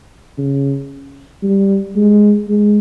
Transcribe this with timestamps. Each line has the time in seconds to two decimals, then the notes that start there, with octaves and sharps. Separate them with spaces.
0.38 C#3
1.43 G3
1.95 G#3
2.48 G#3